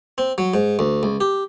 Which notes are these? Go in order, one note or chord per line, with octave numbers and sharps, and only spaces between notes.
C4
F#3
G#2
D2
C#2
G4